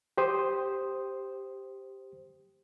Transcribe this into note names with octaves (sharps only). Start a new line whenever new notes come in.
G4 C5 D#6